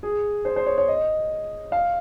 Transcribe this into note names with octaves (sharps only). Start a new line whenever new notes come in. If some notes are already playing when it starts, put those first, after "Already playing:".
G#4
C5
C5
C#5
C#5
D#5
F5